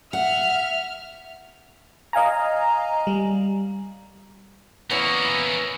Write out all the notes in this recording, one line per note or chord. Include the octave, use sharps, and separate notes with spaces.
E5 F#5 F6
D#5 F5 G#5 A#5
G3
E3 A#3 B3 C#4 E4